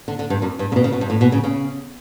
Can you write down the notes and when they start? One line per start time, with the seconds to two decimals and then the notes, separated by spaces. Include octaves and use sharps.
0.08 D3
0.19 D3
0.30 G2
0.42 F#2
0.59 G2
0.72 C#3
0.76 B2
0.84 C#3
0.93 B2
1.01 G2
1.10 A2
1.21 B2
1.32 C#3
1.44 C#3